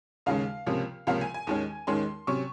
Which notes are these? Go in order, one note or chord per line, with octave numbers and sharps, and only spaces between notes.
D#2 C#3 G#3 C#4 F5
C#2 C3 F3 A#3 C#4
C#2 C3 F3 A#3 C#4 F5
G#5
G#5
D#2 D#3 G#3 C#4
D#2 D#3 G#3 C#4 C6
C3 F#3 C#4 C#6